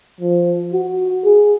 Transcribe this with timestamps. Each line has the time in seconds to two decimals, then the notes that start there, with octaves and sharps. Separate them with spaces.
0.20 F3
0.73 F#4
1.24 G#4